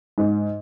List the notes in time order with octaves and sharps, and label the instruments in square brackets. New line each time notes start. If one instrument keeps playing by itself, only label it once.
[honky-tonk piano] G#2